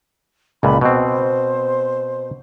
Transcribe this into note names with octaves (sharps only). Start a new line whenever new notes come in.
C#2 A#2 B5
B2 C4 D#5
C5